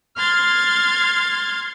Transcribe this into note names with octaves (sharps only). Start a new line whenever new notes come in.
C6 F6 G#6 A6